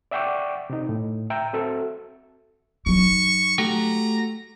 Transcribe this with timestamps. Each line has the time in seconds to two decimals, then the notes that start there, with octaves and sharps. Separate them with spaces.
0.11 D5 E5 F#5 G5 C#6 D6
0.70 C3 D#4
0.89 A2
1.30 E5 G5 A#5
1.53 C4 F#4 A4 E5
2.86 F#3 D#4 C#6
3.58 A3 F#4 G4 A#5